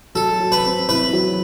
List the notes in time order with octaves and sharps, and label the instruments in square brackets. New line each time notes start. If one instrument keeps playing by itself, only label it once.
[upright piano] F#3 [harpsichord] A4
[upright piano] F#3
[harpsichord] B4
[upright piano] C4
[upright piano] E4 [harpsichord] B4
[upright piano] F#3